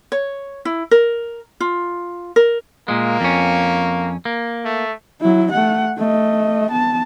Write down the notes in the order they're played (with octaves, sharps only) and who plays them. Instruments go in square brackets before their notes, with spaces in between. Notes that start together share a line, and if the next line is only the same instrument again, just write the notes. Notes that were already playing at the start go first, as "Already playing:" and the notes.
[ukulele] C#5
E4
A#4
F4
A#4
[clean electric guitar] A#2 G#3 [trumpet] A#3
[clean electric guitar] F2 C#4
A#3
[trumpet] A3
[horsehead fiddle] F#3 E4
A3 F#5
A3 D#5
B3 A5